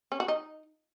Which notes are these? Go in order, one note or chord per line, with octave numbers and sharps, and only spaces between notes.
C#4
F#4
D#4